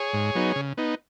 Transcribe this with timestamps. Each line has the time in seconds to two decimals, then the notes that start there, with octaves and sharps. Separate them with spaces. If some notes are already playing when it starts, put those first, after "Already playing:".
Already playing: G#4 C#5
0.13 G#2
0.35 F#3 B3 D#4
0.56 C#3
0.78 B3 D#4